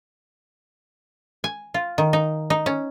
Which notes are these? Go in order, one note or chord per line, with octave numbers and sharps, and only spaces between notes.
G#5
F4
D#3
D#4
D#4
C#4